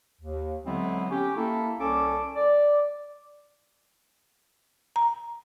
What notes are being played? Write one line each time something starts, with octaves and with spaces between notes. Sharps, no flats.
D#2
D3 F#3 G#3 B3 C4 E4
C#4 G4
A#3 E4 A4
C2 C#4 A4 D6
D5
A#5